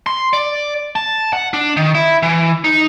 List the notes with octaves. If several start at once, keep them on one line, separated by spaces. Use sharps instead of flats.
C6
D5
A5
F#5
D4
D#3
E4
E3
D#4